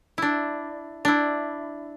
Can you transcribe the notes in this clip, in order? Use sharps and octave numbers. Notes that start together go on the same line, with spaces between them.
D4 E4
D4 E4